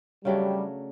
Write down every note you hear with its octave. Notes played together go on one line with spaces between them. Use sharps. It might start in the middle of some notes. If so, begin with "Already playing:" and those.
C#3 F#3 G3 A3 D4